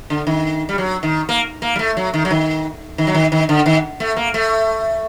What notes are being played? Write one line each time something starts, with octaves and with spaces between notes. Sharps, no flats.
D3
D#3
G3
F#3
D#3
A#3
A#3
G3
A3
F#3
D#3
F#3
D#3
D#3
F#3
D#3
D#3
D3
D#3
A3
A#3
A3